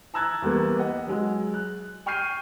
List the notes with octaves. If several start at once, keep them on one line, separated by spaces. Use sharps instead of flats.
A5 A#5 E6 F#6 G#6 A6
E2 G3 A#3 B3
B4 D#5 F#5
F#3 G#3
F#6
G5 C#6 F6 G6 C7 D#7